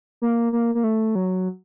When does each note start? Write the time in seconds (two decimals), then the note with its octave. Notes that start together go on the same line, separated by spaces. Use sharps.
0.22 A#3
0.53 A#3
0.75 A#3
0.84 A3
1.15 F#3